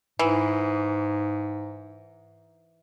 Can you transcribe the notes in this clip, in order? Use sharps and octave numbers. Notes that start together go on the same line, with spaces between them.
G#2 E3